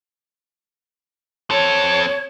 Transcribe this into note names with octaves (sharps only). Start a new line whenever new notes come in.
C4 A4 C#5